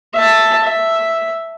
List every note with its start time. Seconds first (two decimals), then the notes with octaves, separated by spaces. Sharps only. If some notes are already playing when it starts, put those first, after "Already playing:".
0.14 E5 A5
0.64 E5